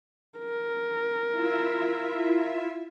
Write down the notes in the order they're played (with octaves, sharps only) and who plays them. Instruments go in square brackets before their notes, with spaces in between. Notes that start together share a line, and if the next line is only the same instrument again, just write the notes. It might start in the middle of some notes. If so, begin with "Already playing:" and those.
[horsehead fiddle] A#4
[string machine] E4 F4 E5